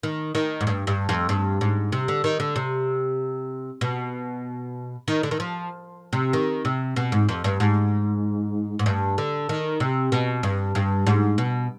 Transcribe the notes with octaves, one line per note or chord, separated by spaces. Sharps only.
D#3
D#3
G#2
G2
G2
F2
G2
G#2
C3
D3
D#3
D3
C3
B2
D#3
D3
D#3
F3
C3
D#3
C3
B2
G#2
F2
G2
G#2
G#2
G2
D3
D#3
C3
B2
G2
G2
G#2
B2